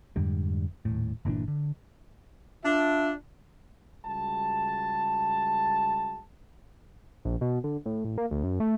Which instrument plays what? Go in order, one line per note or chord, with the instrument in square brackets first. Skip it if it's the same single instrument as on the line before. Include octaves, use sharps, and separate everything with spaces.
[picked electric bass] F2 G#2 D3 G3
D#1 G#1 A2
G1 A#2 E3 D4
D3
[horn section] D4 F4 E5
[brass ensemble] C#2 G3 G#3 F#4 A5
[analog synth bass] A#1
B2
D3
A2
A1
A#3
D2
F#2
A3